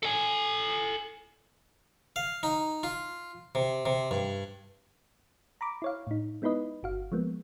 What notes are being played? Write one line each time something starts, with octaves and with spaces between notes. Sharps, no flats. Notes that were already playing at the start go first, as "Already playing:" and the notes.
A4 G#5
F5
D#4
F4
C3
C3
G2
A#5 B5 D6
E4 C#5 F5
A2 D#4
G#3 B3 D#4 E4 B4 D#5
G1 F#4 F5
F3 G#3 A#3 B3